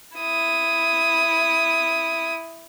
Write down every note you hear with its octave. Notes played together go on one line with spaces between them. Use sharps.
E4 D#6